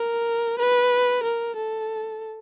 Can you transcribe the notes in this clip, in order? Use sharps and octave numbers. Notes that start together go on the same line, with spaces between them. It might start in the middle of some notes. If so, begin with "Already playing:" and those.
Already playing: A#4
B4
A#4
A4